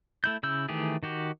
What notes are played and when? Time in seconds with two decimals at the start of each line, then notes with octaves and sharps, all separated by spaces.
0.24 A3 E4 G6
0.43 C#3 E4 E6 G6
0.69 D#3 E3 A3 G4 G#4
1.03 D#3 F#4 G4